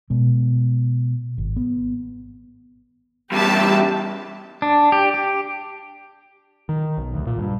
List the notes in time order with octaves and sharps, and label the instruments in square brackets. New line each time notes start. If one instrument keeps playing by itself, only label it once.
[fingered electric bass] B2 G#3
G#1
B3
[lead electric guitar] E2 G3 [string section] G4 E5 A5
[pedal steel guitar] D4
G4
G4
[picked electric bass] D#3
B1
D2
A#2
G2